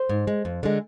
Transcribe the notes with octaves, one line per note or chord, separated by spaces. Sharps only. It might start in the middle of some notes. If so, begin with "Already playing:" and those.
Already playing: C5
G#2
G#3
F2
D3 G#3